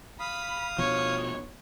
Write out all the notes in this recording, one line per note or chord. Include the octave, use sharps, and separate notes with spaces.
F5 B5 D#6
B2 F3 C#5